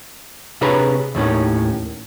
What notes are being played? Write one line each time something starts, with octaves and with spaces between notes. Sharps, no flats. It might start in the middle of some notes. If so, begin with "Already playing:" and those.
C3 D4 G#4 B4 C#5 A#5
D#2 A2 D#3 C#4